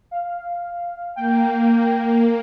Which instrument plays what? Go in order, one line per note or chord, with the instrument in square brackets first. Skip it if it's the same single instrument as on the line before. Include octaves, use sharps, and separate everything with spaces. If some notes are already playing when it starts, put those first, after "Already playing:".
[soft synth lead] F5
[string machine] A#3 [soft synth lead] G5